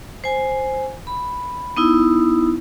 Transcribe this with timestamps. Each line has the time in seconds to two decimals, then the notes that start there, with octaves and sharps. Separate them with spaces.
0.24 C5 G#5
1.07 B5
1.76 B3 D#4 E4